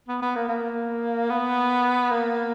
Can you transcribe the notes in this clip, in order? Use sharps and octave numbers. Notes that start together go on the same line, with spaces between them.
B3
B3
A#3
A#3
B3
A#3